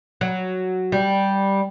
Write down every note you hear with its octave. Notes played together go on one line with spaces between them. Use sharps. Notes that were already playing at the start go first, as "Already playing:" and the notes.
F#3
G3